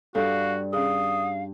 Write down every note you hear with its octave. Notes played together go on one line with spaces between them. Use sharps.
G2 F#4 A4 F5
C#4 G#4 F5 D#6